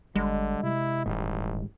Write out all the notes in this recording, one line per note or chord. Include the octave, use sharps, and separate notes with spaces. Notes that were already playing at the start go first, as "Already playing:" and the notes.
G1 D3 G3 G#3
C3 E4
D#1 A1 G#2 D#3 G3